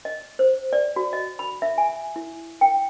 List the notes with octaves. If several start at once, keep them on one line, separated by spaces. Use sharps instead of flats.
D#5
C5
D5
F#4
D#5
B5
E5
G#5
E4
G5